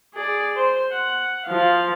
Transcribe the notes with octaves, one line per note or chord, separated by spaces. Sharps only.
G#4 D5
C5
F#5
F3 F5